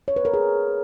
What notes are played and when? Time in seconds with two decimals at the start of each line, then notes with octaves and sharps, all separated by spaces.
0.08 C#5
0.16 B4
0.25 A#4
0.34 G#4